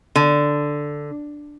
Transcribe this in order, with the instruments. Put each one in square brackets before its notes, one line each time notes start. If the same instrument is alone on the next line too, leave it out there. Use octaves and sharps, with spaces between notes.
[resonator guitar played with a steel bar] D3